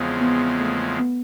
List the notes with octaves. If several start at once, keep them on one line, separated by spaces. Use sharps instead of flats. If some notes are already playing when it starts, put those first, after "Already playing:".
Already playing: E2 C#3 F3 G#3 B3 C4
B3
A3
B3